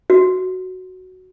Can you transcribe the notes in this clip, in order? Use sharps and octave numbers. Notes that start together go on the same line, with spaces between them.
F#4